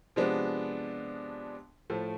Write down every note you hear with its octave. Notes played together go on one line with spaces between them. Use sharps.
C3 F3 G#3 B3 D4
A2 F3 A3